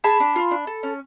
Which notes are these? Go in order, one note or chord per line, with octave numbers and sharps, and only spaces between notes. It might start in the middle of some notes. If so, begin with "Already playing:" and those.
G#4 A5 B5
D4
F4
D4
A4
C#4